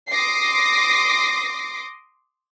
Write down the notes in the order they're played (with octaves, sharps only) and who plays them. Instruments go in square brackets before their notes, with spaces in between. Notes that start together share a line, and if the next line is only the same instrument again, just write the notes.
[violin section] C6 D6 D#6 A#6 C7